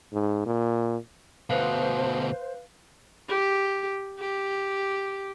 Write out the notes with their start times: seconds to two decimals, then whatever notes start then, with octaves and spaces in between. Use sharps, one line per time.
0.13 G#2
0.46 A#2
1.50 D2 B2 B4 C5 F5
3.29 G4
4.19 G4